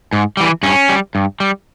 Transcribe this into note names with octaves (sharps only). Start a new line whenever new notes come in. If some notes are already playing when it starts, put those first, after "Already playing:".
G#2
E3 G3
G2 C#4
G3
G2
G3